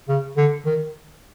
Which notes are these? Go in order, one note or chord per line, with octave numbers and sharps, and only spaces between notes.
C#3
D3
D#3